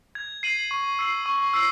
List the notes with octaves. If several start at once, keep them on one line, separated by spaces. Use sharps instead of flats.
G#6
C7 D#7 F#7
C#6
E6 C7 F#7
C#6
E6 C7 F#7